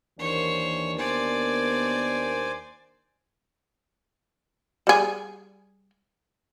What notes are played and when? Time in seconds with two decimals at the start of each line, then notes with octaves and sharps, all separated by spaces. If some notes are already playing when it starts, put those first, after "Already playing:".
0.19 D#2 E3 A#3 D4 C5 C#5
0.99 B3 C5 D5 G#5
4.87 G3 G#4